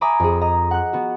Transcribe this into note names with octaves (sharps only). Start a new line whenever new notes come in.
E5 G#5 A#5 B5 D6 D#6
F2 G#4
D#5 A#5
F#5 F#6
B3 F#4